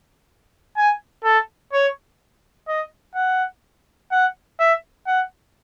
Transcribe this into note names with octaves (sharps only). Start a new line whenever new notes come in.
G#5
A4
C#5
D#5
F#5
F#5
E5
F#5